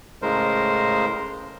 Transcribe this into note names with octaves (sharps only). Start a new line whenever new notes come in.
A2 C#3 G#3 A#4 C5